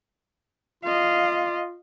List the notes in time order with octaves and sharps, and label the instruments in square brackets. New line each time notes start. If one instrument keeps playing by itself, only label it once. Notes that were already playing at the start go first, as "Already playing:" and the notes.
[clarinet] F4 [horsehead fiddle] D#5 F5